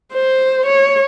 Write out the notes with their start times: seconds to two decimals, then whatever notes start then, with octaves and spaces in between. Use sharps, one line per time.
0.14 C5
0.67 C#5